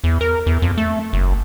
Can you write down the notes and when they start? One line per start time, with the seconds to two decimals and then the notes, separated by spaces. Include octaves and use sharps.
0.04 E2
0.21 A#4
0.47 E2
0.62 F2
0.78 A3
1.13 F#1